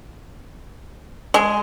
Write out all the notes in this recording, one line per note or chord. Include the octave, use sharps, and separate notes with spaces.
G#3